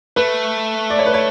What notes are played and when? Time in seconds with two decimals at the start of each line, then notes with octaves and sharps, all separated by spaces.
0.16 A3 B4
0.90 D5
0.99 C#5
1.06 B4
1.14 C#5